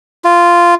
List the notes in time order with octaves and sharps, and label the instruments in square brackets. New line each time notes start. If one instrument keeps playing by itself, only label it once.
[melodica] F4